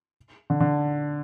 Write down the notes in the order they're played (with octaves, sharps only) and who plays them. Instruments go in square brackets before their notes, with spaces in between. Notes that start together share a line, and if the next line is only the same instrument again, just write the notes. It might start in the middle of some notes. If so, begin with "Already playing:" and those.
[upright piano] D3
D3